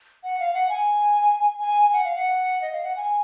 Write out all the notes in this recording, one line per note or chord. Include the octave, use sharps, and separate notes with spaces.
F#5
F5
F#5
G#5
G#5
G#5
F#5
F5
F#5
D#5
F5
F#5
G#5